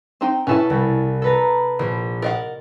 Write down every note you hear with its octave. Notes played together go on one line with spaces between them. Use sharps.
C4 D#4 G5
B2 C#4 E4 A4 G#5 A5
C2
A4 B4 A#5
A#1 A#4
A#4 D#5 F#5 A6